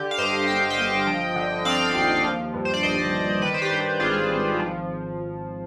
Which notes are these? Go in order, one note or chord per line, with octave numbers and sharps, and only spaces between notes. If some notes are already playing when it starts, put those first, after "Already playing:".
Already playing: D3 G4
F5
G2 C5 D#5
G1 G5
D#5 G5
G1
F3
D3
C4 D5 F5
D#2
F3
G2
C5
D5
G1 C5 D#5
G1
D#3 B4 D5
C5
G4 B4
G2
G4
G#1 F4 G#4
G#1
F3